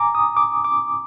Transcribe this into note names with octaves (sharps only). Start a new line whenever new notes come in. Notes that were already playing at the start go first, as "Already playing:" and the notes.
Already playing: G#5 A#5 D6
D#6
D6
D6